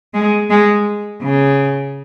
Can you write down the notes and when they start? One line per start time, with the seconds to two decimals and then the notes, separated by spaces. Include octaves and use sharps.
0.14 G#3
0.50 G#3
1.22 C#3